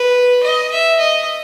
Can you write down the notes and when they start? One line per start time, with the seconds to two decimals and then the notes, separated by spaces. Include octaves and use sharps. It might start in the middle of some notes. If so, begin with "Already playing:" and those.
Already playing: B4
0.43 D#5
0.71 E5
0.99 D#5